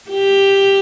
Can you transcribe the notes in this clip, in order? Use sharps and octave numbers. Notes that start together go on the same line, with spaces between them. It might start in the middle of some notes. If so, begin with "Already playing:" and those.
G4